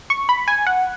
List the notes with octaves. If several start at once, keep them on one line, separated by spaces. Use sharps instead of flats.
C#6
B5
G#5
F#5